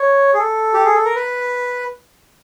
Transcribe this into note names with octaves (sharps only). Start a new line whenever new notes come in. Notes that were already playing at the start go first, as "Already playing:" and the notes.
Already playing: C#5
G#4
A4
G4
G#4
A4
A#4
B4